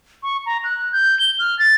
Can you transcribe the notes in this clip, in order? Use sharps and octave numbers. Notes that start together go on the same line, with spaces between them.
C#6
A#5
F#6
G6
G7
F6
A6